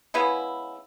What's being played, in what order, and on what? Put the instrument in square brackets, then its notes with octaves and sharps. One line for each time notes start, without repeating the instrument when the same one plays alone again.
[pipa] C#3 G#3 B3 E4